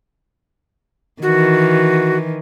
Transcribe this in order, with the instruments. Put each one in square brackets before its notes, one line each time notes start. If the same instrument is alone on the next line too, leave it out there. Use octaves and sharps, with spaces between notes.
[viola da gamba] D#3 E3 [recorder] F#4